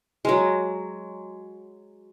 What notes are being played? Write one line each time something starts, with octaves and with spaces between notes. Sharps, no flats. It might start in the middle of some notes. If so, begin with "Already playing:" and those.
F#3 G#3